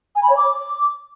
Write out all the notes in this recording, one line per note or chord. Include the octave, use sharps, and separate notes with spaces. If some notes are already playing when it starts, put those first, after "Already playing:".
G#5
B5
C#5
D6